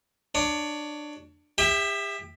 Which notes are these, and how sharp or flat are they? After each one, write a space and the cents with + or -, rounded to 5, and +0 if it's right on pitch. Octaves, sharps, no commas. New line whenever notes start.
D4 +20 C#5 +30
G4 +40 E5 +0 G5 +0